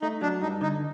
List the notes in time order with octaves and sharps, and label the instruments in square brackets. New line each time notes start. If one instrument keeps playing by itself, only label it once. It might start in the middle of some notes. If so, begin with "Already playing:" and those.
[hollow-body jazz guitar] A3 [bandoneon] D#4
[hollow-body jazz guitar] F#3 [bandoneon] D4
[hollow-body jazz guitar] G2 [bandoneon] D#4
[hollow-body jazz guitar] D3 [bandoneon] D#4